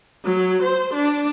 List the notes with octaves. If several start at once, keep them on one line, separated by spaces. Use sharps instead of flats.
F#3
C5
D4